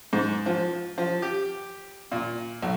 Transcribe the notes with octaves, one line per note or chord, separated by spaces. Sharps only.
G#2
F3
F3
G4
A#2
B1